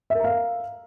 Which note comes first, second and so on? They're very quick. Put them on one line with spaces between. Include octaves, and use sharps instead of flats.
E5 A#4 A#5 F5